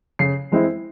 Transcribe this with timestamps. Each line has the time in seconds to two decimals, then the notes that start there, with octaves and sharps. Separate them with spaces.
0.19 C#3 C7
0.52 E3 G#3 C4 E4